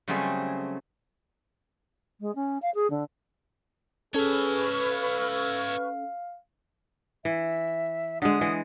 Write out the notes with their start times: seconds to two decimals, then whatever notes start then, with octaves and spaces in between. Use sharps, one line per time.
0.08 C#3 F#3 G3 A3 C4 G#4
2.20 G#3
2.35 C#4
2.62 F5
2.75 G#4
2.90 D3
4.15 C#4 G#4 A4 B4 C#5 E5 C#6 F6
4.91 F5
7.25 E3 E5
8.22 D3 G#3 D#6
8.41 E3 G#3